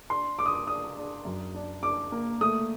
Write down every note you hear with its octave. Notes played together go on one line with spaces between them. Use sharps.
D4 C6
D4 D6
D#6
D6
D4 D#6
D4
F#2
D4
D4 D6
A#3
A3 D#6